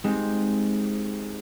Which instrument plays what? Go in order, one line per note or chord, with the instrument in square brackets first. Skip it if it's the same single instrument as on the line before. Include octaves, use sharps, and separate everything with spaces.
[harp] G#3 C4 D#4 G4